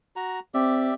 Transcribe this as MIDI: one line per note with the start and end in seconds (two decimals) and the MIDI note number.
0.16 0.40 66
0.16 0.40 82
0.54 0.93 60
0.54 0.94 67
0.54 0.94 74
0.54 0.94 76